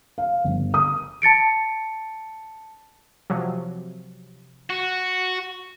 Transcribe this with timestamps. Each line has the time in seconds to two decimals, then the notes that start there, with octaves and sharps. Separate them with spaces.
0.18 F5
0.44 G1
0.74 D#6
1.22 A5 A6 C#7 D7
3.30 C3 F3 F#3
4.70 F#4